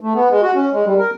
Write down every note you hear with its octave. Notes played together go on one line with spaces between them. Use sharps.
A3
B3
G#3
F#4
C#4
G#3
G3
A#4